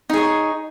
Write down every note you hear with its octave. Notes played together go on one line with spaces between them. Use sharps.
D#4 G#4 C#5